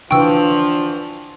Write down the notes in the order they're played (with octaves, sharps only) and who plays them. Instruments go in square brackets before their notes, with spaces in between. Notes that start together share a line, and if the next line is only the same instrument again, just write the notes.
[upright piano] D3 E3 C#6 [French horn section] F3 D4 [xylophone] G5 E6